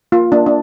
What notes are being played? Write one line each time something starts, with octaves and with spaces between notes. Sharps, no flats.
A#3 F4
A#3 D4
D4